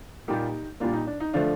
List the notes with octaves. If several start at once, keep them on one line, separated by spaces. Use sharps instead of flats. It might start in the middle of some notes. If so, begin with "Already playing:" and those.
A#2 G3 A#3 D#4 G4
A#2 G3 A#3 D4 F4
D#4
D4
D#4
D3 F3 A3 D4 F4